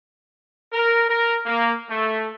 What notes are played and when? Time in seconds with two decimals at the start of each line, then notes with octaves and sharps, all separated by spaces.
0.73 A#4
1.08 A#4
1.46 A#3
1.89 A3